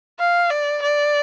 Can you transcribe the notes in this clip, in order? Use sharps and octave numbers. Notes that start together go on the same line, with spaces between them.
F5
D5
D5